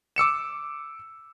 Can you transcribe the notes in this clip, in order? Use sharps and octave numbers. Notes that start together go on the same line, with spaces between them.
D6 E6 C#7 E7